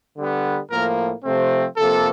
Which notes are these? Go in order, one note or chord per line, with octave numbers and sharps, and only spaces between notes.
D3 G3 B3
A2 F3 A#3 A#4
C3 F3 A3 C4
C3 F3 A#3 A4